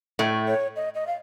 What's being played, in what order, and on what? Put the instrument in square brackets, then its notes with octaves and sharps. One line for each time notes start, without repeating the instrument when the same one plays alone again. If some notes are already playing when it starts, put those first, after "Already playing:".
[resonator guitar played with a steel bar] A2 A3
[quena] C#5
D#5
D#5
F5